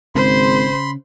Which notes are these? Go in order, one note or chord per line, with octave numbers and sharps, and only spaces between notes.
G#1 C#3 C5 B5 C6